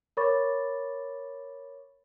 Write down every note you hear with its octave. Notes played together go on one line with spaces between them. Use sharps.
A#4 C#5 B5 C#6 D6 A6